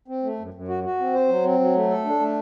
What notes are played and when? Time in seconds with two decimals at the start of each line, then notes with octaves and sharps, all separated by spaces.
0.08 C4
0.23 A3
0.39 F#2
0.54 F#2
0.68 F#4
0.84 F#4
1.00 C4
1.14 C5
1.29 F#3
1.44 C4
1.59 F#3
1.75 A3
1.89 A4
2.05 D4
2.20 A3